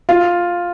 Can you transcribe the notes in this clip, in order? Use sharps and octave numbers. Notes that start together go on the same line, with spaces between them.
F4